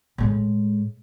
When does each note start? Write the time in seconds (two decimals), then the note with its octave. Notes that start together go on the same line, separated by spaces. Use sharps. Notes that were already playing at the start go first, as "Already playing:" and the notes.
0.18 A2 G#3